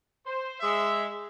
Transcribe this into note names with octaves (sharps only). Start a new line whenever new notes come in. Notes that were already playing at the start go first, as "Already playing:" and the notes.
C5
G#3 E5